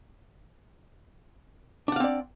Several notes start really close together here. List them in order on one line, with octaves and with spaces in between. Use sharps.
D4 F#5 F5 C4 D5